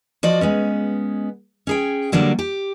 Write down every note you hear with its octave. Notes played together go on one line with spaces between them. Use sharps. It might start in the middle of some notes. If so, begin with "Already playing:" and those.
F3 F#4 D5 D#5
G#3 B3 C#4
C#4 G#4 G5
D3 F#3 G3 A#3 D4
G4